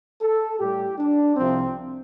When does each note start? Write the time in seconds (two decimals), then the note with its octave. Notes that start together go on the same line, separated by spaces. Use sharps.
0.22 A4
0.60 A2 G3 G4
0.98 D4
1.37 C2 C3 F3 C4